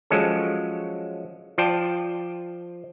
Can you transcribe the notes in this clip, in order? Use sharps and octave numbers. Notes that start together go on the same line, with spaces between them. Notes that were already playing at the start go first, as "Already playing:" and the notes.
F3 F#3 G#3 C#4 A4
F3 F4 D5 G5 A5